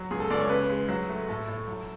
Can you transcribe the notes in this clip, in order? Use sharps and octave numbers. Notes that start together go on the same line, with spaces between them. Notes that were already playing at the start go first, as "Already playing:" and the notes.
Already playing: F#3
C#2 G#4
A4
C#2 D5
C#5
C#3 B4
G#3
F#3
A3
A2 A4
A2
F#3